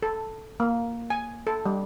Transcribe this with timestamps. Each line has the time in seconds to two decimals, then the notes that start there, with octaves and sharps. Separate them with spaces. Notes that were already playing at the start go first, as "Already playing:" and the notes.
0.02 A4
0.60 A#3
1.10 G#5
1.47 A4
1.66 G3